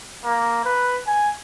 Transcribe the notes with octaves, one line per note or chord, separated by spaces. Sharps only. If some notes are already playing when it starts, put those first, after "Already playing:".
A#3
B4
G#5